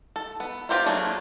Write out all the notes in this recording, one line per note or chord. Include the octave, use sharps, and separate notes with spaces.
A4
B3
C4 F4 G4 C5 E5
F#3 A3 A#3 D4 G#4